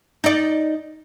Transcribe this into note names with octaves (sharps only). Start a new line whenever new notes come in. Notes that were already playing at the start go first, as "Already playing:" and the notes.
D#4 D5